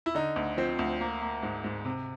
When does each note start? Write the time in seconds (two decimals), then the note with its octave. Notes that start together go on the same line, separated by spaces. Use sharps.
0.06 E4
0.15 D3 D#4
0.36 D2
0.57 F3 C4
0.79 D2
1.01 A#3
1.21 A#3
1.43 G#2
1.64 G#2
1.85 C3